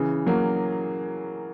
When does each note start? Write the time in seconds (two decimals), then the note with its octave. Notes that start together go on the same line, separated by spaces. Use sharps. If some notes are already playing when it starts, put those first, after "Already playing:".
Already playing: C#3 E3
0.27 F#3 A#3